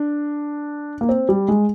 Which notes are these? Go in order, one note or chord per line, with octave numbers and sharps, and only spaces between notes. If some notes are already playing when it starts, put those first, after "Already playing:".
Already playing: D4
A#3
C4
G3
G#3